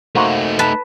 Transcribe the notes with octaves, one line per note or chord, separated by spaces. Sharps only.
A3 A#3 D#4 F#4 C5
B4 A5